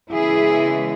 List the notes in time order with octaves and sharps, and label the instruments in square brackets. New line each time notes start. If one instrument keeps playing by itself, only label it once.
[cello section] C#3 E3 G#3 B3 E4 G#4